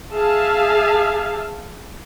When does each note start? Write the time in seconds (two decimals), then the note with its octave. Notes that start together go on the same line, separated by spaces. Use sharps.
0.14 G#4 E5 F5 A5